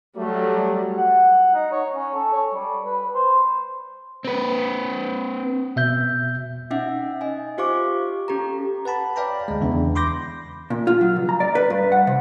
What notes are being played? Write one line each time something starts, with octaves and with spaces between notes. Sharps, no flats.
F#3 G3 A3
F#5
D#4
C#5
C#4
A4
C#5
G3
B4
C5
C4 B4
B2 E5 G6
C#4 D#4 E5 F#5
D#5 G#5
F4 G4 C5 F5 C#6 D6
C#4 G4 A4 A#5
B4 F#5 A5 B5
C#5 D5 F5 G5 A#5 B5
D2 G#3
E2 C#3 E3 D4
B5 C6 D6 G6 A#6
A#2
F4
F#3
C#2
A#5
D5
B4
G2
F#5
C3